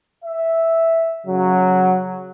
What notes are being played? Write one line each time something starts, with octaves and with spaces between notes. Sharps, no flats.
E5
C#3 F#3